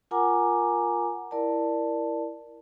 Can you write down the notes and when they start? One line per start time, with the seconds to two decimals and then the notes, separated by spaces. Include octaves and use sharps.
0.11 F4 A#4 F#5 G#5 A#5 D6
1.31 E4 A#4 D5 A5